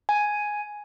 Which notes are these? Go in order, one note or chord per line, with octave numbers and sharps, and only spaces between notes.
G#5